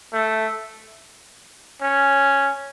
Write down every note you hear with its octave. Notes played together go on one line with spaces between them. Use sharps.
A3
C#4